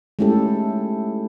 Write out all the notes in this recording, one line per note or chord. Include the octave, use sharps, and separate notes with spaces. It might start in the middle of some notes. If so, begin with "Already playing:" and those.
G#3 A3 C#4 E4 G4 A4